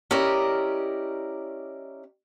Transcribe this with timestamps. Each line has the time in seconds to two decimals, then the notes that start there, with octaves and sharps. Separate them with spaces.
0.11 C#4 E4 G4 A#4 D5 D#5